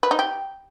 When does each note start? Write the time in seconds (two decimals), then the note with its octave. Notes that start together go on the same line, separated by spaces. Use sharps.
0.03 B4
0.11 D#4
0.19 G4